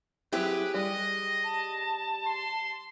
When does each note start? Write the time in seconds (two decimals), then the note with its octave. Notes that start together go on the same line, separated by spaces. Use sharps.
0.33 F#3 C4 E4 G4 G#4 B4
0.74 G3 D#5
1.44 A5
2.26 C6